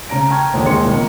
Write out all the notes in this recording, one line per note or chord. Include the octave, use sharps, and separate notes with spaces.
C#3 A#5 A#6 D7
G5 A5 A#5 C#6 F6 G#6
A#1 D#2 D3
D#2 C3 G#3 C6 C#7
C#2 B2 D#3 A#3